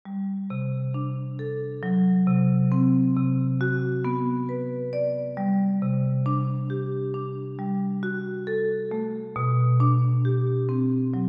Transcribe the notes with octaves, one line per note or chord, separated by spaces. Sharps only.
G3
C3
D4
A4
F#3
C3
C4
C3
F#4
B3
B4
D5
G3
C3
D4
G4
D4
G3
F#4
A4
A3
B2
D4
G4
C4
F#3